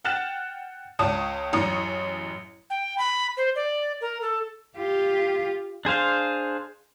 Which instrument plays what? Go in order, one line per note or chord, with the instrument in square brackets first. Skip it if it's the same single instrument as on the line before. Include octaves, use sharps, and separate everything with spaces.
[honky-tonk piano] F#5 G5 F6 F#6 A6 E7
C#2 C#5 A5 D#6
A1 F#2 C#5 A#5 D#6 C#7
[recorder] G5
B5
C5
D5
A#4
A4
[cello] F4 G4
[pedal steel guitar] D4 G#4 C5 F5